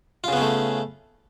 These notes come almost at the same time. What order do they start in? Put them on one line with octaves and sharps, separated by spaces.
F4 C#3 B3 C#4 A3